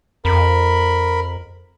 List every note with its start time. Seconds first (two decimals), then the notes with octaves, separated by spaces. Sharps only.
0.25 F2 A#4 B5